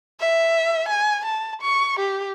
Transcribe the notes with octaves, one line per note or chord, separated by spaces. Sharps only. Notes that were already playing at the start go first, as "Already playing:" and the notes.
E5
G#5
A5
C#6
G4